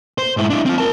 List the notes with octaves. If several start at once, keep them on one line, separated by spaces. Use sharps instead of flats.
C5
G#2 E4
D4 E4
C4 F4
A#4 A5